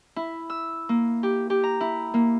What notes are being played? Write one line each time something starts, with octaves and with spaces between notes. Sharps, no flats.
E4
E6
A#3
G4
G4
A#5
E4
A#3